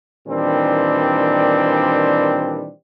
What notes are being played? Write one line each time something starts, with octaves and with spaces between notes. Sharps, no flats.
A#2 D#3 E3 G3 C4 D4